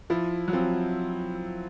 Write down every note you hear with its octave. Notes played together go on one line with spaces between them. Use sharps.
F3 E4
F#3
F3 C4